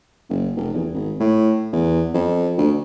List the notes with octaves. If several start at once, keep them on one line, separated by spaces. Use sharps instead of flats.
F#1
F1
E2
G#1
A2
E2
F2
D2